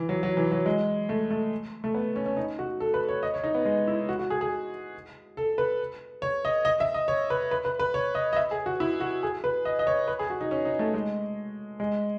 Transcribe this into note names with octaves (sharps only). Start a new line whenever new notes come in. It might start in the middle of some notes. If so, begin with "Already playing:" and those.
Already playing: E3
F#3
F#3
E3
F#3
G#3
A3
A3
A3
B3
C#4
C#4
D#4
F#4
A4
B4
C#5
D#5
C#5
D#4
B3
G#3
E4
F#4
F#4
G#4
G#4
A4
B4
C#5
D#5
D#5
E5
D#5
C#5
B4
B4
B4
B4
C#5
D#5
D#5
E5
G#4
F#4
E4
F#4
G#4
B4
D#5
D#5
C#5
B4
G#4
F#4
D#4
C#4
D#4
A3
G#3
G#3